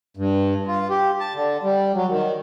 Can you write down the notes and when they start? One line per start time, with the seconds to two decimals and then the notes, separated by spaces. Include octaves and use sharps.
0.17 G2
0.68 F4
0.90 G4
1.20 A5
1.34 D3
1.63 G3
1.94 F#3
2.09 D#3